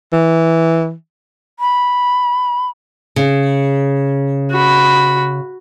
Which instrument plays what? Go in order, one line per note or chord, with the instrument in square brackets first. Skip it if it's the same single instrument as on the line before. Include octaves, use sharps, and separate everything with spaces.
[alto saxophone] E3
[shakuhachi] B5
[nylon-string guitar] C#3
[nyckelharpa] F#4 B5